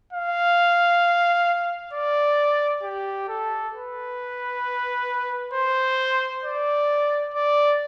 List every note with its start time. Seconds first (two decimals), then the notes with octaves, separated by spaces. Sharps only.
0.13 F5
1.93 D5
2.83 G4
3.28 A4
3.74 B4
5.54 C5
6.44 D5
7.34 D5